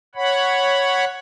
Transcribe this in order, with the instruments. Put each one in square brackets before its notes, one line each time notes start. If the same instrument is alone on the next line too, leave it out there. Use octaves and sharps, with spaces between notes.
[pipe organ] C#5 F#5 B5